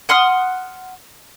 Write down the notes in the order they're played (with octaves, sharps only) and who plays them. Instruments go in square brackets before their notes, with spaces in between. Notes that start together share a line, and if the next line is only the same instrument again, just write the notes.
[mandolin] F#5 C6 D#6 F6